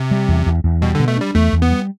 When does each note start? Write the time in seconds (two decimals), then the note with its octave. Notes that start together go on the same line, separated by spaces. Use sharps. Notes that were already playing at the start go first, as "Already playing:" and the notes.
Already playing: C3
0.11 G3
0.29 E2
0.46 E2
0.64 E2
0.81 B2 G3
0.95 D3
0.99 B2
1.08 A3
1.17 G3 D4
1.35 E2 A3
1.53 E2
1.62 B3
1.70 G3